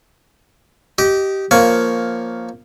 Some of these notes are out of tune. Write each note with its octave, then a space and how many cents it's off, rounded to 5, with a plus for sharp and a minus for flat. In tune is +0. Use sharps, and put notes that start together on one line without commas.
G4 -15 D#5 +5
F3 +0 A#3 +0 C#5 +5